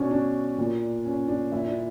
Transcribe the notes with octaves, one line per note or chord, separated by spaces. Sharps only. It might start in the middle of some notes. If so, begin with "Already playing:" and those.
Already playing: B2 C#4 D4
D4
A#2
C#4
D4
A#2 E4
D4